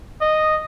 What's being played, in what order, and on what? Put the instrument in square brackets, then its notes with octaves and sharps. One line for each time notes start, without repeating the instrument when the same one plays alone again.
[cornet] D#5